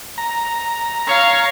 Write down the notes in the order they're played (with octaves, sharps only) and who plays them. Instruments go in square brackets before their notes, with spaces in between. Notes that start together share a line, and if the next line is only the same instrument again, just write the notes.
[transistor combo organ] A#5
[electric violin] C#5 F5